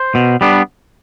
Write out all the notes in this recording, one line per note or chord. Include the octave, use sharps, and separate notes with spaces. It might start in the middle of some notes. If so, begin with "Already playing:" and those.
Already playing: C5
B2
G3 B3 D4